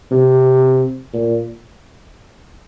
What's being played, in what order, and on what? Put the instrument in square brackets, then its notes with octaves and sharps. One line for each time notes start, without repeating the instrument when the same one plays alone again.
[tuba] C3
A#2